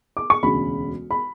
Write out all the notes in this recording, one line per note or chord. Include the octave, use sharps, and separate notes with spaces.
D6
C#6
E1 D2 C#3 B5
B5